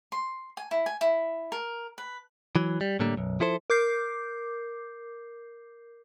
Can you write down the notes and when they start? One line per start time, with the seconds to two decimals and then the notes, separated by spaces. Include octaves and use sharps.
0.12 C6
0.57 G#5
0.71 E4
0.86 G#5
1.01 E4
1.52 A#4
1.98 B4
2.56 E3 F#3
2.81 G3
3.00 A2 D3 G3 A#3
3.17 B1 F#2
3.40 F3 E4 A4 C5
3.70 A#4 D6 G6 C7